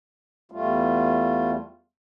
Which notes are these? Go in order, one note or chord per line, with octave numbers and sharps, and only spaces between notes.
E2 G3 A3 F4